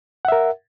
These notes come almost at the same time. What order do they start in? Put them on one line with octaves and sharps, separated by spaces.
F#5 E5 A#4